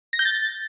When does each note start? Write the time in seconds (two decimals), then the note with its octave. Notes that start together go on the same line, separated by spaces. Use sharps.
0.13 A#6
0.19 G6
0.25 A6